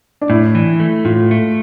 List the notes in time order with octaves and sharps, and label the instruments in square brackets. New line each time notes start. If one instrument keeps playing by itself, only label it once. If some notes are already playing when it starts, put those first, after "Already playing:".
[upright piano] D4
[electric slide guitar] A2 [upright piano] E4
[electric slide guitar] E3
A3
[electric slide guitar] A2 [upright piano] F4
[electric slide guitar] A3